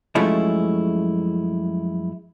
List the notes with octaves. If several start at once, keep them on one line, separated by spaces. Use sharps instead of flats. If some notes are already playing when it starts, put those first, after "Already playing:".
F#2 F3 G#3 A3 C#4 E4